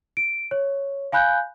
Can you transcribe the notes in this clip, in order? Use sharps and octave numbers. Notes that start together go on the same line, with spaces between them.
D7
C#5
F5 G#5 B5 F#6 G6